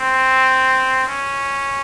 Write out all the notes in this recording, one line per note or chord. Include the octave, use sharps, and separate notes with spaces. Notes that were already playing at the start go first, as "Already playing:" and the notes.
Already playing: C4
C#4